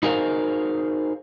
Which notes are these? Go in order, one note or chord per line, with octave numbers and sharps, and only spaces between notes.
D#4 F#4 G#4 A#4 C5 F5